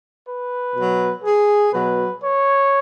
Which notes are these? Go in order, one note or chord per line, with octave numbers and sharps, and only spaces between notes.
B4
B2 F#3
G#4
B2 F#3 B4
C#5